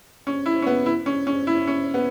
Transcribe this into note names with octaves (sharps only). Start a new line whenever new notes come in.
C#4
E4
C#4
B3
E4
C#4
C#4
E4
C#4
B3